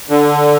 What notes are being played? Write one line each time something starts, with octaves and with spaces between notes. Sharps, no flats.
D3